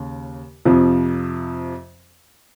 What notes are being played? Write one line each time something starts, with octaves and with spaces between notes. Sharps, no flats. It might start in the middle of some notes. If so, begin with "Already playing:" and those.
Already playing: D#2 C#3
F2 C3 F3